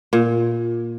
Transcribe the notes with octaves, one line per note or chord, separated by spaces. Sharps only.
A#2